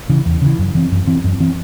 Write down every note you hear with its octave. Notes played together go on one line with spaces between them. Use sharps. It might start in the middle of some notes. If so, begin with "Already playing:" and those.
C#3 E3
E2
C#3 E3
F#2
E3 C4
F#2
E3 C4
F#2
E3 C4